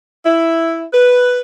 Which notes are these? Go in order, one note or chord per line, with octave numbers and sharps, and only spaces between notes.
E4
B4